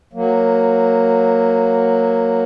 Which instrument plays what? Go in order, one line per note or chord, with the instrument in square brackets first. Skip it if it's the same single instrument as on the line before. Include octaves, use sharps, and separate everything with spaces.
[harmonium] F#3 A#3